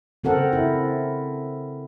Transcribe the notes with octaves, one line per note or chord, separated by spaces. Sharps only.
C#3 C4 A4 A#4 F#5
E4